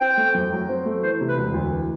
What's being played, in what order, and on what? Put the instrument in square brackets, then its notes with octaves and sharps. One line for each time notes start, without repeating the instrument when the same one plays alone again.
[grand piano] C4 [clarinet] G5
[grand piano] A3
F#2
F#3
C4
A3
[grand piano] E3 [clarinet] C5
[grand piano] C3
[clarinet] B4
[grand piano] E1
D2
E3